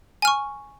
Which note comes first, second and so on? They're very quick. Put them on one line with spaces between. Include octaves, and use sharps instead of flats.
G#5 F6 C#6